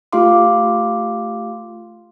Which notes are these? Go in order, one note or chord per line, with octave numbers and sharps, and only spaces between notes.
A3 F4 G4 F5 C6 D6